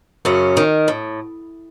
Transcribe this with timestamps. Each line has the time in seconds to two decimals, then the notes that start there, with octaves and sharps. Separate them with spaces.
0.25 F#2 C#3 C#4
0.57 D#3
0.88 A2